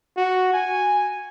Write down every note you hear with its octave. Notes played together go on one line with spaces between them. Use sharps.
F#4
G#5